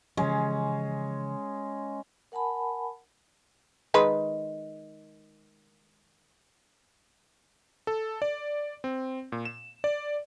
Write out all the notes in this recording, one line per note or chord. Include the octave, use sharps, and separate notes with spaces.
C#3 E3 F3 G#3 C#4
A#4 F#5 G#5 A5 B5
D#3 G#3 B4
A4
D5
C4
A#2
E7
D5